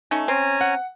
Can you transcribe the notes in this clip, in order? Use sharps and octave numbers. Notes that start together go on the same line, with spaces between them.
A3 C#4 D#4
C4 C#4 G#5 A#5
F#5